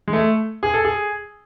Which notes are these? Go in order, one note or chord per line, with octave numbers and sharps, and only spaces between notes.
G#3
A3
G#4
A4
G#4